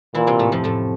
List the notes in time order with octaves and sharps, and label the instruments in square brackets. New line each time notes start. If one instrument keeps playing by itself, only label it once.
[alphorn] A#2 [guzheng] E3 E4
[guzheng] C3 C4
A2 A3
F2 F3
A2 A3